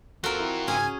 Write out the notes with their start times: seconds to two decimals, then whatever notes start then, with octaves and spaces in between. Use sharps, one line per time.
0.24 D#2 C4 F4 F#4 A4 A#4 G5
0.40 E4
0.68 G#2 C#3 C#4 G#4 G#5